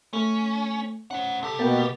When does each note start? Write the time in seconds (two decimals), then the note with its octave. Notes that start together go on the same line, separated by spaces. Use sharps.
0.13 A3 C#4
1.11 C#4 C5 F#5
1.43 C2 G4 A4
1.59 B2 A#3 B3 G5 A6